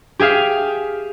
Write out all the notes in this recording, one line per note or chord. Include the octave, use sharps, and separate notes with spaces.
G4 G#4 E5 F5